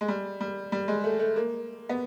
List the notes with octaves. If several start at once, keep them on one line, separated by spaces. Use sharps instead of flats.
G#3
G3
G3
G3
G#3
A3
A3
A#3
B3